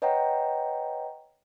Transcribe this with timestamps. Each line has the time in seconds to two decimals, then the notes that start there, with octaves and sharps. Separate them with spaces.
0.02 B4 C#5 D#5 F#5 G5 A#5